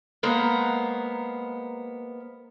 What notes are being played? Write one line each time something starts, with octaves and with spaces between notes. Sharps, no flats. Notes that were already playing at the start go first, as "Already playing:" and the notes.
G#3 A#3 B3 C5 A#5